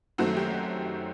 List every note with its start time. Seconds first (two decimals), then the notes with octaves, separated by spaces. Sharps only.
0.18 F#2 D#3 F#3 A3 C4 F#4
0.37 G4